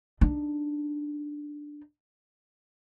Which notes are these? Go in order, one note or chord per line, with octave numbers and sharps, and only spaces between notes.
D4 D#4